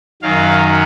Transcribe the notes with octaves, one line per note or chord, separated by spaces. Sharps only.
F#2 D#3 F#3 F5